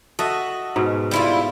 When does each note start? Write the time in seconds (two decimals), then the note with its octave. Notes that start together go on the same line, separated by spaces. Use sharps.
0.19 F#4 A4 D#5 E5
0.76 G#2 B2
1.11 G3 E4 F4